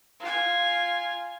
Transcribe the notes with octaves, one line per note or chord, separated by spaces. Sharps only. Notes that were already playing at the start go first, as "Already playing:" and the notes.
F4 G#5